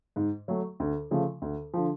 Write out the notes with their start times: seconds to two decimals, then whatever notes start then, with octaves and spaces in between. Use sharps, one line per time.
0.16 G#2
0.48 F#3 A3
0.80 D2
1.11 C#3 F3 A3
1.42 D2
1.74 D3 F3